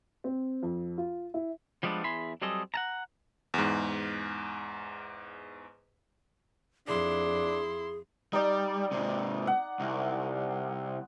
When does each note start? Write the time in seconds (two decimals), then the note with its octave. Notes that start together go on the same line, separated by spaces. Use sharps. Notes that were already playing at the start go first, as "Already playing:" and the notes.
0.24 C4
0.63 F2
0.98 F4
1.34 E4
1.83 F3 G3 G#3 B3 C4 D4
2.04 E2 E4 G#4 B5 C6
2.42 F#3 G3 C4 G#4 A4 D#5
2.74 F#5 A5 A#5
3.54 E2 G#2
6.88 F2 D4 E4 G#4 C6
8.33 G3 D#4 D5
8.92 G#2 C3
9.47 F#5
9.80 C2